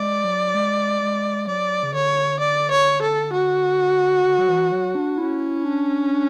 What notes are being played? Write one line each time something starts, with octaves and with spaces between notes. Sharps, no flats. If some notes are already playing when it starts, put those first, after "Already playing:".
Already playing: G#3 D5
F#3
G#3
G#3
F#3 D5
C#3
D3 C#5
D5
C#5
A4
F#4
D3
F#3
E3
F#3
D4
C#4 E4
D4
D4